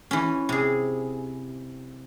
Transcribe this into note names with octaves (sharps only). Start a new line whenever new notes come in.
E3 C#4
C3 G#4